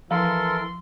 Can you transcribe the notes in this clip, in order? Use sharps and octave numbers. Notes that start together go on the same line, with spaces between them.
E3 F3 A4 A#4 C6